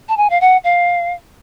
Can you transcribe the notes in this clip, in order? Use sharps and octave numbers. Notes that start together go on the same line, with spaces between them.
A5
G#5
F5
F#5
F5